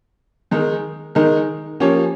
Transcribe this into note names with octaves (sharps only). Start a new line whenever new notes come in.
D#3 G#3 D#4 A#4
D#3 G#3 D#4 A#4
F3 A#3 C#4 G4 C#5